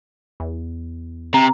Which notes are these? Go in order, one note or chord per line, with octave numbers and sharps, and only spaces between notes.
E2
C3 A#5